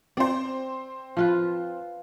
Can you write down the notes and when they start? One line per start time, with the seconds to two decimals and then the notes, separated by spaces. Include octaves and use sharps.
0.17 C4 C5 D5
1.17 F3 F4 B4